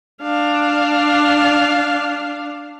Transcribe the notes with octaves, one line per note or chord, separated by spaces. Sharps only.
D4 F5